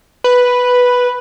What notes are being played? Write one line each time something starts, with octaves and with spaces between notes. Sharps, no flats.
B4